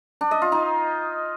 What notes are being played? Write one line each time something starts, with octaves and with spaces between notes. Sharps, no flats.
D4
D#5
F4
D#4